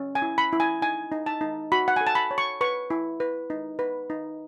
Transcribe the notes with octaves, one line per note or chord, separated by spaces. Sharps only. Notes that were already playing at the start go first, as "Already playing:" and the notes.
Already playing: C#4
G#5
E4
B5
E4
G#5
D#4 G#5
D#4
A5
D#4
F#4 B5
F#5
A4 G#5
A5
B5
C#5
C#6
B4 C#6
E4
B4
D#4
B4
D#4